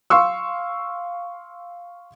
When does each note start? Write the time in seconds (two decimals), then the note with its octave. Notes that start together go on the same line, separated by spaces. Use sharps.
0.10 F5 C6 C#6 E6